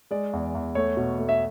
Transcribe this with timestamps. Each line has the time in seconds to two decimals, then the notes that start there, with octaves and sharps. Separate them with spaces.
0.11 G#3 D5
0.33 E2
0.55 E2
0.75 A3 C#5
0.97 B2
1.18 A3
1.29 E5